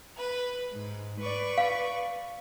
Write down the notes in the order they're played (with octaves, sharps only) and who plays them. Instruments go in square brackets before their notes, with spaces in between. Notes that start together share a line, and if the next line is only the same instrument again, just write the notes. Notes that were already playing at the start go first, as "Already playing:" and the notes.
[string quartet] B4
G#2
B4 D5 C#6
[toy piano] F5